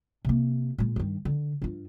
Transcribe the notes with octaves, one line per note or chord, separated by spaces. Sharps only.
C3 A#3
A#2 G#3
G2 D#3
D3
G2 F4